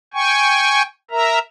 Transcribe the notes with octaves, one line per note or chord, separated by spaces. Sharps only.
G5 G#5 C#6
A#4 E5 A#5